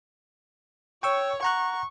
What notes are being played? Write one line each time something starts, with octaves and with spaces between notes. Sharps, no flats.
C#5 G5 C#6 E6
F#5 A#5 C#6 F#6